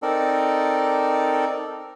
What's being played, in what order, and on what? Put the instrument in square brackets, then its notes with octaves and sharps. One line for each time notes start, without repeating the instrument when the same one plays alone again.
[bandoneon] C4 D#4 A4 A#4 D5